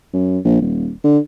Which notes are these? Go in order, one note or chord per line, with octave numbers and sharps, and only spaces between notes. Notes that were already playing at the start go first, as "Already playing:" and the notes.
F#2
A#1
D#1
D3